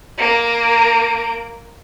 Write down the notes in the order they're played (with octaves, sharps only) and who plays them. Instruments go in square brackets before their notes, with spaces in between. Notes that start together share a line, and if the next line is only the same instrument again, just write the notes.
[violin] A#3 D7